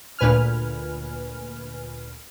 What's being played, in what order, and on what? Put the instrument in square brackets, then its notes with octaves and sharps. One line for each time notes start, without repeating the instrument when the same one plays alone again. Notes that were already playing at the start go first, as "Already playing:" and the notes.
[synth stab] D2 A#2 B4 G#5 F6